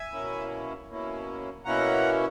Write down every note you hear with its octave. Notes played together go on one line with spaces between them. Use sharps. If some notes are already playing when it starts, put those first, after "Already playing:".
Already playing: E5 G#5
B2 A#3 C#4 E4
B2 A#3 C#4 E4
B2 A#3 C#4 E4 F#5 A#5